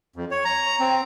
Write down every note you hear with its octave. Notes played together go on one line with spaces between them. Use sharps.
F2
C#5
A#5
C4